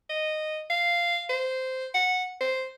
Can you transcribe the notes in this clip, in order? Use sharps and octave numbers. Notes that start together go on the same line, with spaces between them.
D#5
F5
C5
F#5
C5